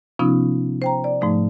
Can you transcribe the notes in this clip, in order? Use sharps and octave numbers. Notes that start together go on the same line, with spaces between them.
C3 F3 B3 C#4 D#4 F4
C5 G5 A#5
D5
G#2 F3 A3 D#4